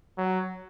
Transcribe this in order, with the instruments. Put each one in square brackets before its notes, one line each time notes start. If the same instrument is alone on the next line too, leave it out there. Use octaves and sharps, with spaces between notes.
[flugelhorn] F#3